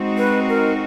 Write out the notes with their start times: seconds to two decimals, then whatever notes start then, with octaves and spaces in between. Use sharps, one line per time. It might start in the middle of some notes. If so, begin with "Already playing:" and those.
Already playing: G#3 C4 D#4 F#4
0.18 B4
0.49 A#4